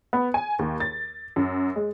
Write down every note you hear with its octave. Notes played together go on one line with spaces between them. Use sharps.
B3
G#5
D#2
A6
F#2
G#3